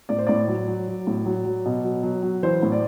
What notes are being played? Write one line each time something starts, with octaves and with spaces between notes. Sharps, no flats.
A2 D5
C5
A2 D5
F#3
F#3
F#3
A2
F#3
F#3
B2
F#3
F#3
F#3
E3 C5
A2
D5